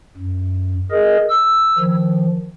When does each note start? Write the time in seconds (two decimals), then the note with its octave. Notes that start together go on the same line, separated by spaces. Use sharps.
0.17 F#2
0.91 G#4 A#4 D#5
1.29 E6
1.78 D#3 F3